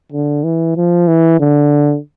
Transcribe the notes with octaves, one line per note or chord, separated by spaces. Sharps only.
D3
E3
F3
E3
D3